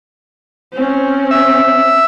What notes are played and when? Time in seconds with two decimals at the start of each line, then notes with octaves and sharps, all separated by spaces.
0.73 C4 C#4
1.31 E5